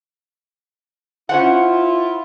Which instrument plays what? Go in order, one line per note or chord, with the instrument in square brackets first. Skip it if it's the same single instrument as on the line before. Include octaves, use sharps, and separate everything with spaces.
[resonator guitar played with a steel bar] C#4 C5 F#5 [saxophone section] E4 F4